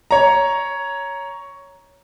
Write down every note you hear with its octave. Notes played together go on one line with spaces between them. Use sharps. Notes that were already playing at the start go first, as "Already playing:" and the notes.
C#5 A#5